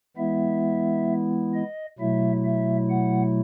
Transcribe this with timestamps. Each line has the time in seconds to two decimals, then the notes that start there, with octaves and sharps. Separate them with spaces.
0.17 E3 G#3 B3 E4 E5
1.54 D#5
1.98 B2 F#3 A3 E4 E5
2.44 E5
2.90 F#5